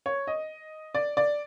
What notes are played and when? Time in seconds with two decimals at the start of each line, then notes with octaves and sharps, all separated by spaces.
0.06 C#5
0.27 D#5
0.95 D5
1.17 D5